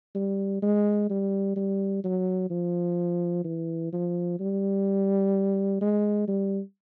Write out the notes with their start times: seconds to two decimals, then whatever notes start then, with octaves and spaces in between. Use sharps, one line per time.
0.15 G3
0.62 G#3
1.10 G3
1.56 G3
2.04 F#3
2.50 F3
3.44 E3
3.93 F3
4.40 G3
5.81 G#3
6.28 G3